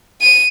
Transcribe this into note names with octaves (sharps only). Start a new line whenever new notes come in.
D#7